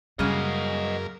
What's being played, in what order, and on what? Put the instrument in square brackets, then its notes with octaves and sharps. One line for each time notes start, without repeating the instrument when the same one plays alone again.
[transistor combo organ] F#2 A#4 [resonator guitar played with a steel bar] C#3 G#3 A#3 [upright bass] G3 [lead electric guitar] D#5 F#5